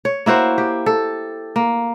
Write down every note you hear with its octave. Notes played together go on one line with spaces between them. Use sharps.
C#5
A#3 E4 F#4 C5
G4
A4
A#3